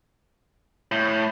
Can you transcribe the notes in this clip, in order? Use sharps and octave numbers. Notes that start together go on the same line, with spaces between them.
A2